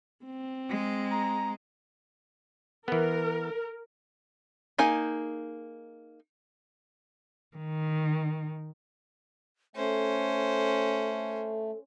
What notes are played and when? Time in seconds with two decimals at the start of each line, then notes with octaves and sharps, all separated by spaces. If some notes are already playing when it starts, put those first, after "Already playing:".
0.25 C4
0.69 G#3
1.11 A#5
2.88 E3 B3 A#4
4.79 A#3 D#4 G#4 G#5
7.57 D#3
9.76 A3 C#4 A4 C5